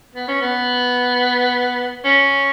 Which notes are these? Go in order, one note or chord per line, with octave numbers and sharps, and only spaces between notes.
B3
C#4
B3
C#4